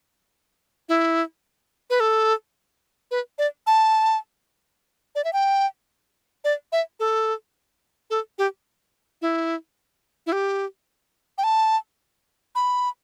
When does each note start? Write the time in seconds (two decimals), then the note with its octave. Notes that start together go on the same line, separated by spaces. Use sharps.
0.89 E4
1.90 B4
2.00 A4
3.11 B4
3.38 D5
3.67 A5
5.15 D5
5.24 E5
5.33 G5
6.44 D5
6.72 E5
7.00 A4
8.10 A4
8.38 G4
9.22 E4
10.26 E4
10.32 G4
11.38 G5
11.44 A5
12.55 B5